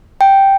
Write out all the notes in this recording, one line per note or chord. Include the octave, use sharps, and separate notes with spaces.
G5